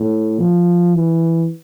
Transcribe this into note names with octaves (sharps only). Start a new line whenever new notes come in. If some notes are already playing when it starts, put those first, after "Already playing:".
Already playing: A2
F3
E3